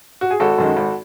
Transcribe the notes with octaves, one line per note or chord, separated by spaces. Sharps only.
F#4
G#4
G#1 F#4 A4
F#2 D#3 G#3
G#1